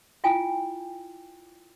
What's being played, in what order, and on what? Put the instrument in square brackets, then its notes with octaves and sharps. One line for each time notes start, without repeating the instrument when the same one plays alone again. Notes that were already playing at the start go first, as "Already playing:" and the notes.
[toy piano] E4 F4 G5 G#5